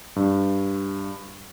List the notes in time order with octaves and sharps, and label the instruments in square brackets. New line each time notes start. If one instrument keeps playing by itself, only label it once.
[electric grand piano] G2